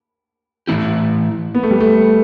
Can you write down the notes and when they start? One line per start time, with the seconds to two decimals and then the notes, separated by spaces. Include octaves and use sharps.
0.67 A2 E3 B3 E4 G4
1.55 B3
1.63 A3
1.71 G3
1.80 A3